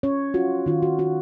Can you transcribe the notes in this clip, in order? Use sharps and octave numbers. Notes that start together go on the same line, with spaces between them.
C#4 C#5
F4 F#4
D#3 F4
F#4
F4 F#4